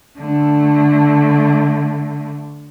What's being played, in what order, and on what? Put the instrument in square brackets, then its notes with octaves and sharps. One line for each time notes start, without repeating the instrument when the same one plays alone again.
[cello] D3 A3